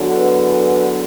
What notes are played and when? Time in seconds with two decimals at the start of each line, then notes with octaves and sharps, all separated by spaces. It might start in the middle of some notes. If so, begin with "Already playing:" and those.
Already playing: E2 D3 F#3
0.13 B4